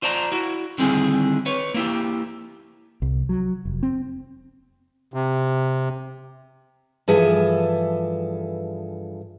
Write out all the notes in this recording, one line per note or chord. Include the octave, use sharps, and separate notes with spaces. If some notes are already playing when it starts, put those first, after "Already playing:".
F4 C5 D5 A5 A#5
E4 F#4
D3 D#3 G3 C4 E4 G#4
B4 C#5
A#3 E4 G4
C2
F#3
F1
C4
C3
G2 E3 F3 G#4 A4 E5